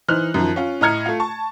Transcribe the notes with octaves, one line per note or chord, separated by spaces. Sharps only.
E3 D#4 C5 F6 F#6
F#2 D#3 F3
C#4 F4
A2 D#5 A#5 F6 G#6 C#7
A3 F4
A5 C#6